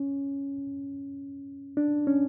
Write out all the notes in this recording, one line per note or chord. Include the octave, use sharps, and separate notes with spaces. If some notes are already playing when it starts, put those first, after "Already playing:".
Already playing: C#4
D4
C#4